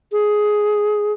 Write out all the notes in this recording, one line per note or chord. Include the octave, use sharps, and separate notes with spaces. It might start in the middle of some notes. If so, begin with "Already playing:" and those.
G#4